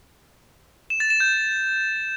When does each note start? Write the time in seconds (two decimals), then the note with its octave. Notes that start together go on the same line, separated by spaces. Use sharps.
0.90 E7
1.00 A6
1.10 E7
1.20 G6